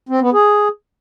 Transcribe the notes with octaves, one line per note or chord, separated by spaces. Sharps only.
C4
B3
G#4